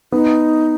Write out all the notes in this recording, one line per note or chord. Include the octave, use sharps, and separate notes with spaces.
B3 D#4